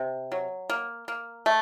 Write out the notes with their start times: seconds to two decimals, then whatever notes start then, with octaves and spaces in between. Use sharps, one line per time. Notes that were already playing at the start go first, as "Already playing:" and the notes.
Already playing: C3
0.32 F#3
0.69 A#3
1.08 A#3
1.46 A3